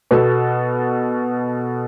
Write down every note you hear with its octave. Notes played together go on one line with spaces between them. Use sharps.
B2 B3 F#4 A4